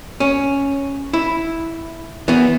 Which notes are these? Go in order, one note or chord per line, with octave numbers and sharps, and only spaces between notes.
C#4
E4
E3 B3